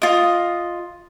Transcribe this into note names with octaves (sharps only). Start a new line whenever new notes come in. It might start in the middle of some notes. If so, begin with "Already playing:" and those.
F4 D#5